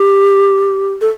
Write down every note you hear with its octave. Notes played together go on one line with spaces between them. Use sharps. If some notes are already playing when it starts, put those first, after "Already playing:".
Already playing: G4
A4